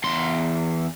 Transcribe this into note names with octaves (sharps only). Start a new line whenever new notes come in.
E2 C6